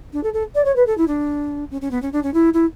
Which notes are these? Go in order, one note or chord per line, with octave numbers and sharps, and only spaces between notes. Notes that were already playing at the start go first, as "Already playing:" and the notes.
D4
A4
A4
D5
C#5
B4
A4
E4
D4
C#4
C#4
B3
C#4
D4
C#4
E4
E4